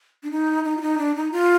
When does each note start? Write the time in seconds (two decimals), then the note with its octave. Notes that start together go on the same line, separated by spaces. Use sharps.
0.23 D4
0.31 D#4
0.64 D#4
0.77 F4
0.82 D#4
0.98 D4
1.16 D#4
1.32 F4